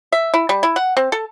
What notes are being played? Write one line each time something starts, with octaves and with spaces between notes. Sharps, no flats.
E5
E4
G3
E4
F#5
C4
A4